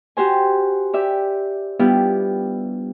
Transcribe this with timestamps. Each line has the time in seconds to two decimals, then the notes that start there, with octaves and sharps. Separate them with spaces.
0.17 F#4 G4 C5 G#5
0.93 G4 D5 E5
1.79 G3 B3 D4 E4 F4 G4